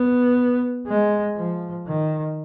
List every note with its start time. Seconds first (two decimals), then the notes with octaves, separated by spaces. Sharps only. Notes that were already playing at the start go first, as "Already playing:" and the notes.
Already playing: B3
0.87 G#3
1.37 F3
1.87 D#3